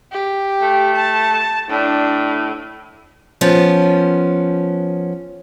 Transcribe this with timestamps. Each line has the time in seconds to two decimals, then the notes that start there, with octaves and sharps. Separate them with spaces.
0.12 G4
0.62 A3
0.96 A5
1.70 A2 D4
3.41 F3 B3 C#4